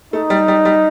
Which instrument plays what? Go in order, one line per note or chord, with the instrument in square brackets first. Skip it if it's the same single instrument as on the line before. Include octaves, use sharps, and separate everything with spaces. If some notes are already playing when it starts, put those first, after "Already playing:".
[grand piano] A3 [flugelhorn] D#4
[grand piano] G3
G3
G3